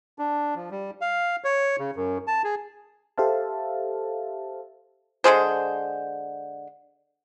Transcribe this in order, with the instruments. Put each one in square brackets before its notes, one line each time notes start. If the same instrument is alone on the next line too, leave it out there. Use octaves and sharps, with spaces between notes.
[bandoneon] D4
F3
G3
F5
C#5
C#3
F#2
A5
G#4
[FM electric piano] G4 A4 C5 E5 F5 A5
[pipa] D3 G#3 G#4 C5